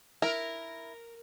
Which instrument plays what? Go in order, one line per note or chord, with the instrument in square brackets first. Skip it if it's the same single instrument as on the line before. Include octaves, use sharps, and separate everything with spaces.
[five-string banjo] E4 [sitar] A#4